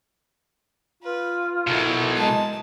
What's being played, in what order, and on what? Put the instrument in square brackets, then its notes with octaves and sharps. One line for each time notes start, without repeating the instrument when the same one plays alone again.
[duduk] F4 [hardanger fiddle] B4
[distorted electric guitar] B1 B2 [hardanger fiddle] E4 A#4
[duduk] G#3 [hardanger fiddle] A5